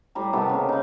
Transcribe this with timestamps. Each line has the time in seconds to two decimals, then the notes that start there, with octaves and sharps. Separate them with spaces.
0.15 A2 G3 A#5
0.33 C3 D#3 A3 B3
0.49 C#3 A#3
0.69 C#3 D#4